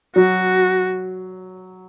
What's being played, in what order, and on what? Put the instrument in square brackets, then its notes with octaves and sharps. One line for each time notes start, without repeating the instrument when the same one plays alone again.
[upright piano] F#3 [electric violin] F#4